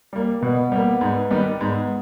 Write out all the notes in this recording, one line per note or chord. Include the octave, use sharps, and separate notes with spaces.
G3 A#3
B2 B3
G3 A#3
G#2
D#3 G3 B3
G#2 B3